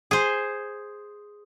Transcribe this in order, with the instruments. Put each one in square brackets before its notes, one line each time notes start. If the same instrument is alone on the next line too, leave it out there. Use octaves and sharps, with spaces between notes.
[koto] G#4 C5